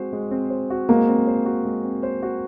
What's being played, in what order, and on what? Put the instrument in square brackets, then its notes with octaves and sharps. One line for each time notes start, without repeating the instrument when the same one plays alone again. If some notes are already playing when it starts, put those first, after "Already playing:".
Already playing: [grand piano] G#3 C4 F#4 C5
G#3
C4
C5
F#4
[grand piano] G#3 [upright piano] A#3
[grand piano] C4
C5
F#4
G#3
C4
C5
F#4